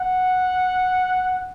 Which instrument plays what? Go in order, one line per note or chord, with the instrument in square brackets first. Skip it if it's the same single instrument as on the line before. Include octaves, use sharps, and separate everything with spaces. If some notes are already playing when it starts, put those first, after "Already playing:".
Already playing: [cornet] F#5